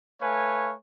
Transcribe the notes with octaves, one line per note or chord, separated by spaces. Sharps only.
A3 B4 C#5 F5 G#5